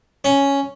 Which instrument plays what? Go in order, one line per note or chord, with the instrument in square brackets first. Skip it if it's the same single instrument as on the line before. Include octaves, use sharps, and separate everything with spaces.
[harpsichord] C#4